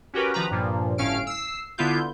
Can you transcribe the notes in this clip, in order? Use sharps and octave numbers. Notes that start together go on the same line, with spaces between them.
C#4 F#4 G4 A#4 B4
D#3 F3 B4 A#5
G2 A#2 F3
G1 A2 C#4 F5 F6 D7
E6 C7
D3 B3 E4 F4 G6